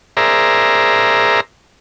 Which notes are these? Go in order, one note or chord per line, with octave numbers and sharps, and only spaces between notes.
G#4 A#4 C5 D5 E5 A#5